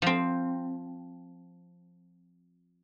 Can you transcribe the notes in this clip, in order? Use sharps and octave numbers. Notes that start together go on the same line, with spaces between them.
F3 C4